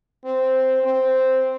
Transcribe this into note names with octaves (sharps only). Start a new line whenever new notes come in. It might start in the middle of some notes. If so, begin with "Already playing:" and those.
C4
C4